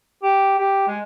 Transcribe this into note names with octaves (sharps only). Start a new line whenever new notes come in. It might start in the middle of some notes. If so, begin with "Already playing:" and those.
G4
G4
G#3